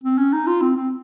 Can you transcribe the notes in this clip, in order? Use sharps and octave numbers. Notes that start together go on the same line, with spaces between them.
C4
C#4
D#4
F4
C4
C4